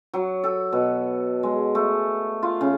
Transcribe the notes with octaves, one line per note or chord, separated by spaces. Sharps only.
F#3
A4
B2
G#3
A3
F4
C#3